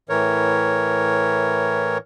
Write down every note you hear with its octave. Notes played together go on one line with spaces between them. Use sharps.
A2 E3 A#4 C#5